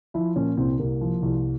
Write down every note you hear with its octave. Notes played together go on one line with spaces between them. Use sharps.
F3 E4
A#2 C#4
C2 C4
C2 A#3
F3
C2